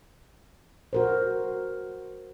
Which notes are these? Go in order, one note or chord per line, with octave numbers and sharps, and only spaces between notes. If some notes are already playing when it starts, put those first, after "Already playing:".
F#4 A#4 C5